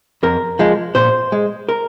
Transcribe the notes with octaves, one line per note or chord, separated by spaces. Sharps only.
F2 A#4
F3 G#3
A#2 C5
G#3
A#4